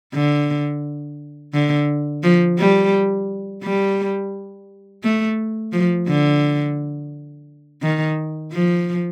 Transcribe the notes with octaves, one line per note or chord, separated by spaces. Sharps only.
D3
D3
F3
G3
G3
A3
F3
D3
D#3
F3